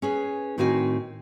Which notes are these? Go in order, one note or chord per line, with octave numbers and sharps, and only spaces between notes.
C#4 G#4 B4
A2 D#3 C4 F#4 F5 G#5